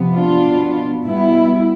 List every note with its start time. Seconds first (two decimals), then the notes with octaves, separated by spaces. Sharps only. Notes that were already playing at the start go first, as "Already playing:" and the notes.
Already playing: C3 F3 B3
0.16 D4 F4
0.46 B2 B3
1.05 B2 G3 B3 E4